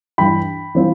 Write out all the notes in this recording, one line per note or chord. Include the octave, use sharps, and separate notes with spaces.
G2 E3 G3 G5 B5
E3 G3 C4 F4